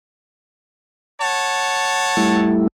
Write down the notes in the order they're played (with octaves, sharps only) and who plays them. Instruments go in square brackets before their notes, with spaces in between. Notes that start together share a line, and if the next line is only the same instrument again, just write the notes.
[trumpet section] C#5 F#5 A5
[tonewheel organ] G3 A3 E4